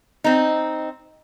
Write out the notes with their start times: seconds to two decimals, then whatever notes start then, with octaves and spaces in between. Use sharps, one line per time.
0.24 C4 D#4